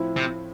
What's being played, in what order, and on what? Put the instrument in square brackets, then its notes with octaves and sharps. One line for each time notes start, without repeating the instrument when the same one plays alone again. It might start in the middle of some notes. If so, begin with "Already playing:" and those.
Already playing: [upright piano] A2 F3 C4 E4
[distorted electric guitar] C3